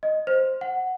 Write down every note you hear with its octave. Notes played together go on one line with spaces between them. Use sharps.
D#5
C5
F#5